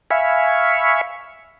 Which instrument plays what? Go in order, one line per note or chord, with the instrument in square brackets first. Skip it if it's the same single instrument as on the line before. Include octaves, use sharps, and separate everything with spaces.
[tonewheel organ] E5 F5 G#5 B5 C#6